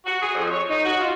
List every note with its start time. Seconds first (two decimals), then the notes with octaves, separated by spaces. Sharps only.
0.06 F#4
0.22 G#4
0.35 F2
0.52 C#5
0.69 D#4
0.85 F#4
1.00 F4